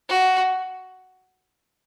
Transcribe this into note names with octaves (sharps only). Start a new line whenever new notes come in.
F#4